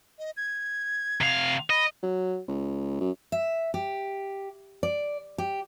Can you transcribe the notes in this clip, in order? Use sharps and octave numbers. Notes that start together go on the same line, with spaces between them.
D#5
G#6
C3 F5
D#5 B5
F#3
C#2
F#2
E5
G4
D5
G4